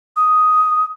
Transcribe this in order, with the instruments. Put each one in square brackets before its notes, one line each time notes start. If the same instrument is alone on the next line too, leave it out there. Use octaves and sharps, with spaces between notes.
[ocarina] D#6